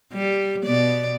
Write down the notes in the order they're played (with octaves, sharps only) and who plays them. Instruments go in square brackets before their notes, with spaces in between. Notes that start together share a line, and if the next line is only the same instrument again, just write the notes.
[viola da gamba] G3
B2 B3 D5